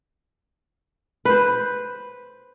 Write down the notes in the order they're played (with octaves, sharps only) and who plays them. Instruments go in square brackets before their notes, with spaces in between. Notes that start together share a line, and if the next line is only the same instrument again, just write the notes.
[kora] B4 C5